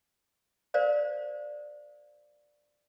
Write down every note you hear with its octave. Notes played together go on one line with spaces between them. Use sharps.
A#4 C5 D5 F5